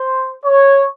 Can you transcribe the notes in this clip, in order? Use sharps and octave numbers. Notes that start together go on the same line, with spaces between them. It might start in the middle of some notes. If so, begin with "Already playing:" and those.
Already playing: C5
C#5